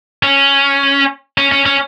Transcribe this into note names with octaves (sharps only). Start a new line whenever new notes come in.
C#4
C#4
C#4
C#4